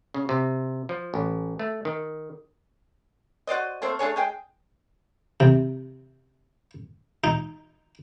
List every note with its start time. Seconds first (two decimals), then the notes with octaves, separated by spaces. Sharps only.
0.14 C#3
0.29 C3
0.89 F3
1.14 A1
1.59 A3
1.85 D#3
3.47 F#4 C5 D5 D#5
3.82 A3 A#3 C4 C5
3.99 A3 D4 G#4 C#5
4.16 G#3 G#4 G5
5.40 C3
7.24 D#4